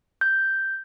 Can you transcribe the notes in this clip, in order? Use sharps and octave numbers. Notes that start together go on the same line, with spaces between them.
G6